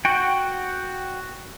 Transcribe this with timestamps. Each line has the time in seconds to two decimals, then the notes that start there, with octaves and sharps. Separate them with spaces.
0.05 F#4 F#5 G5